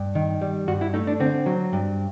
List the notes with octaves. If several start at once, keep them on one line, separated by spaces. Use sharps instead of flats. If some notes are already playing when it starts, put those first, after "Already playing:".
Already playing: G2
D#3
G3
G2 F#4
E4
A3 D#4
D4
D3 C4
F#3
G2